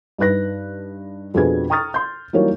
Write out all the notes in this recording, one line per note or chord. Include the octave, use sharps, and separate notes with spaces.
G2 D#4 B4 F#6 A#6
F2 B2 D4 G#4 B4 G#6
G5 A#5 C#6 D#6 F6 A6
C6 G6
E3 F#3 G3 A#3 D#4 C#5